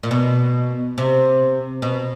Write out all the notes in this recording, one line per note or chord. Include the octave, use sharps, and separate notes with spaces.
A#2
B2
C3
B2